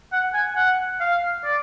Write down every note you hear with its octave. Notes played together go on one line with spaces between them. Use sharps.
F#5
G#5
F#5
F5
D5